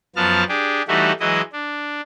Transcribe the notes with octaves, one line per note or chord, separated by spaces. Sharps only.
F#2 F3 B3 A5 F6
D4 G4 G#4
E3 G3 A3 D#4 E4 F#4
E3 F#3 G#3 E4 D#5
D4